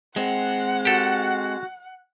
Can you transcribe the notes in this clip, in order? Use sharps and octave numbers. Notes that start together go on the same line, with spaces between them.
G#3 C4 F#5
F#4 G4 A4